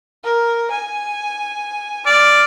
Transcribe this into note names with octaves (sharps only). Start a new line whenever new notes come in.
A#4
G#5
D5 F6